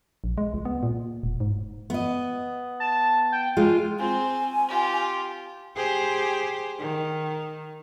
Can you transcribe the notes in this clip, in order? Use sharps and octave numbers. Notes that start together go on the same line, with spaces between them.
A#1
G#3
C#2
B3
A#2
E1
G#2
B3 D#5
A5
G5
G#3 F4
C4 C5 G#5
F4 G4
G4 G#4 C5
D#3